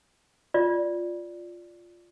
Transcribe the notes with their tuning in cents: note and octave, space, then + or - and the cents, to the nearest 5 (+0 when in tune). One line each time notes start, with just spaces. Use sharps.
F4 +0 D5 +0